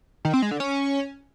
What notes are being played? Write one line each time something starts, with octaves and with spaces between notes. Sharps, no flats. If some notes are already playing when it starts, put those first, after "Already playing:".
D#3
C4
G#3
D3
C#4